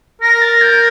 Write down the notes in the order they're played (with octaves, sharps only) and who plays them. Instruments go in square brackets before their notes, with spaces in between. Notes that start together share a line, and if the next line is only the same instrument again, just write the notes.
[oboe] A#4 [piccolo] A#6
[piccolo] A6
G6